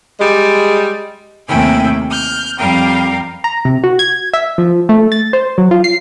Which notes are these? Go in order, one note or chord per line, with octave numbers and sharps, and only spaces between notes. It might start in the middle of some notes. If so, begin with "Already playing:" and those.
G3 G#3
D#2 C3 A3 E4 G5 G#5
F6 G6
F2 G3 A#4 F5 G5
A#5
C3
F#4
G#6
E5
F3
A3
A6
C5
F#3
F4
C7